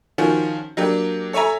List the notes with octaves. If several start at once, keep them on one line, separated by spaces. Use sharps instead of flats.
D#3 F3 C#4 F#4
F#3 A#3 D4 G4
A4 C#5 E5 G#5 A#5